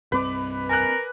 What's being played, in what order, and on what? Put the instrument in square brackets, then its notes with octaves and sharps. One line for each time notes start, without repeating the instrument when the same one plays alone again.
[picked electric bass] C2 G2 C4 [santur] B4 D5
[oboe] A#4 [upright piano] G#5 F#6